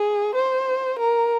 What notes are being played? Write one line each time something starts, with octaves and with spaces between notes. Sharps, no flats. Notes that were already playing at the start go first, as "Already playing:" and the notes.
Already playing: G#4
C5
A#4